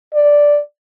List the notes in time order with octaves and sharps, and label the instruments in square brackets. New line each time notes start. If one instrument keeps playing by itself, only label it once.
[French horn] D5